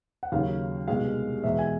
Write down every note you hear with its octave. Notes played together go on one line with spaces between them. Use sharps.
F#5
D#2 C#3 F#3 F5
C2 B2 G#3 F5
E2 B2 G#3 E5
G#5